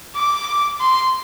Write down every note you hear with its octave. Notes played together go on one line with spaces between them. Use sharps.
D6
C6